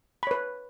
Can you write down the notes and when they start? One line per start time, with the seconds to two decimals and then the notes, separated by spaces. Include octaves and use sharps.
0.23 B5
0.27 C#5
0.31 B4